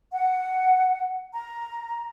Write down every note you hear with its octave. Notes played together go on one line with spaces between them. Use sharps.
F#5
A#5